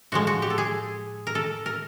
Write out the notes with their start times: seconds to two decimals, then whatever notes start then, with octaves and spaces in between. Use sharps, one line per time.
0.12 A2 F3 G#3 F#4
0.27 F#4
0.42 G4
0.50 A4
0.58 G#4
1.27 A#4
1.35 A4
1.66 A#4